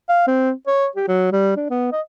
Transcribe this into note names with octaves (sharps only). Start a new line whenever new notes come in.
F5
C4
C#5
G4
F#3
G3
D4
B3
D#5